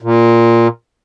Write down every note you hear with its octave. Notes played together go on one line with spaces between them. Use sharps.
A#2